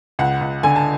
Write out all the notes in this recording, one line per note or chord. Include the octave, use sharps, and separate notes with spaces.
C#2 F#5
C#2
D3 G#5
A5